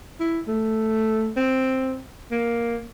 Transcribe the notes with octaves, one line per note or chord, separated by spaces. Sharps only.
E4
A3
C4
A#3